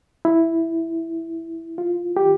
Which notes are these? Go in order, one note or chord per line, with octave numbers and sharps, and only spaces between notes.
E4
F4
G4